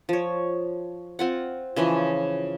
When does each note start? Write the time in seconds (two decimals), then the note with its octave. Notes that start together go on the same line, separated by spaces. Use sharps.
0.09 F3 C#5
1.19 C4 F4 F#5
1.76 C#3 E3 F3 G#3